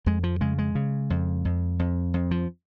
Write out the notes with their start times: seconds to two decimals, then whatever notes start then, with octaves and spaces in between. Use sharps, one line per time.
0.06 F2 G#3
0.23 F3
0.41 C#3 G#3
0.58 G#3
0.75 C#3
1.10 F2
1.45 F2
1.79 F2
2.14 F2
2.31 F3